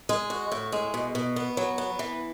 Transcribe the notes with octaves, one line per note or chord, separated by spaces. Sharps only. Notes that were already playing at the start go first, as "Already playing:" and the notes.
G#3
F#4
A2
G#3
B2
B2
B3
F#3
B3
E3